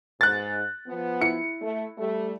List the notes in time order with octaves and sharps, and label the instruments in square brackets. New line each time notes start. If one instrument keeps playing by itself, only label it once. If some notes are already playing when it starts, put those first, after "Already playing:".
[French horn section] G#2 [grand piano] F#6 A6
[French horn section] F3 B3
[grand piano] E4 C#7
[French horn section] A3
G3 A3